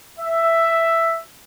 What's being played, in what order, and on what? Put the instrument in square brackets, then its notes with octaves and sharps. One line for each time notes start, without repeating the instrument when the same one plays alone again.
[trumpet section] E5